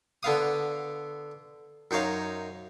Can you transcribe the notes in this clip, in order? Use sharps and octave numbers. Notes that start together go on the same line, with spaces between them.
D3 B3 F5 D#6
F#2 D#4 C5 C#5 F5